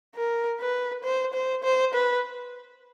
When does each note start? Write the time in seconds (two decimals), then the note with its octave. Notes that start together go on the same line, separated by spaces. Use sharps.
0.15 A#4
0.61 B4
1.04 C5
1.34 C5
1.63 C5
1.94 B4